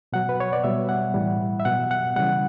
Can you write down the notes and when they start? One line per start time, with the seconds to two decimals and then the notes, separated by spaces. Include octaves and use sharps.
0.13 B2 F#3 F#5
0.29 B4
0.40 C#5
0.53 D5
0.64 B2 G3 E5
0.89 F#5
1.14 A2 E3 G3
1.60 E5
1.65 B2 F#3 F#5
1.91 F#5
2.16 C#3 E3 G3 F#5